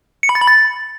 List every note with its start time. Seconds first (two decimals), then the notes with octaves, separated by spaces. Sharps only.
0.23 C#7
0.29 B5
0.35 A6
0.41 B5
0.48 A6